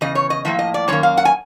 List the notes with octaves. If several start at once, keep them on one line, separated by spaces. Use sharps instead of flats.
E2 C#3 D#5
C#5
D#5
A2 F3 A#3 E5
D#5
D5
F#2 D#3 A#3 C#5
F5
F#5
G#5